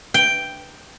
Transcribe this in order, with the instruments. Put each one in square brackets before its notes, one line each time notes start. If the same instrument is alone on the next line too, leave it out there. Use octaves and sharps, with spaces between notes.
[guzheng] G5